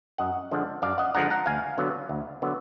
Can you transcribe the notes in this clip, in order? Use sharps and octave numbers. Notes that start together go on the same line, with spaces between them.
F#2 D#5 F#5
D3 F3 G#3 D4
F#2 D5 F5
D#5 F#5
D3 F3 G#3 D4 F#5 A#5
F#5 A#5
D2 F5 G#5
D3 F#3 B3
D2
D3 F#3 B3